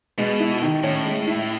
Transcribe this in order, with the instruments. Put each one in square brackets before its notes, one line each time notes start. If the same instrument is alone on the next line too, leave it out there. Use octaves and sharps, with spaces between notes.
[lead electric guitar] B2 [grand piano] G#3
[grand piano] E4
D#3
[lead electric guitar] A2 [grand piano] C#4
[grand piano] G#3
E4